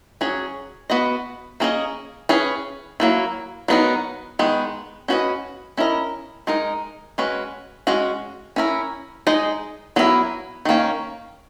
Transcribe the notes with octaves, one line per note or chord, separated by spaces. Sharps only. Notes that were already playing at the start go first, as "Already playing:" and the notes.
F#3 C#4 G#4 C#5
B3 F#4 B4 D#5
A#3 C#4 G#4 D#5
C#4 G#4 B4
F#3 A#3 E4
F#3 B3 D#4 F#4 A#4
D#3 G#3 B3
C#4 F#4 B4 D#5
C#4 E4 A#4 D#5
G#3 D#4 A#4
G#3 C#4 F#4 B4
G#3 C#4 F#4
C#4 E4 A#4
G#3 D#4 G#4 D#5
F#3 B3 E4 A#4
D#3 A#3 C#4